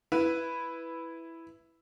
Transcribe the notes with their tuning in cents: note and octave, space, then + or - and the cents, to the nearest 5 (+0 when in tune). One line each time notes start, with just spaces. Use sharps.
E4 +0 B4 +0